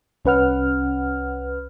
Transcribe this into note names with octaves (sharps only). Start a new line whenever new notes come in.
C2 C#4 B4 F#5 F6